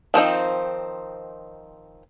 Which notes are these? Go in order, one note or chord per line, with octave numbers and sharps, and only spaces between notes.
D#3 F3 C4 D#4